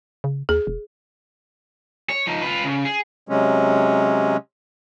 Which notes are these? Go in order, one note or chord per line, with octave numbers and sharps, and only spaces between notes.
C#3
D#2 G#4
E1
C#5
F3 D#4
F4 B4
C#3
G#4
C3 F#3 G#3 C#4